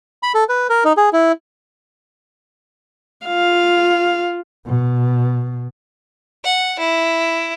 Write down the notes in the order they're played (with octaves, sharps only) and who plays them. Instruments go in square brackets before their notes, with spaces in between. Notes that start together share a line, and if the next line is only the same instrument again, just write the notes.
[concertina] B5
A4
B4
A#4
D#4
G#4
E4
[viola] F4 F5
[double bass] B2
[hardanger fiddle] F#5
E4